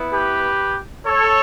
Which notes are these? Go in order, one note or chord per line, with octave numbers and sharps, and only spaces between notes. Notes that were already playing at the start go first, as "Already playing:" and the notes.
Already playing: B3 E4
G4 B4
A4 C#5